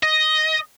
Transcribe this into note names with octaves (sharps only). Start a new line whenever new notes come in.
D#5